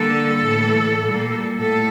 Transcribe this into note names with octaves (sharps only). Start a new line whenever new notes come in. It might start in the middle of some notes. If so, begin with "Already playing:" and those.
Already playing: D3 G3 A#3 A4
A2 E3 G3
A#2 G3 A#3
A2 A4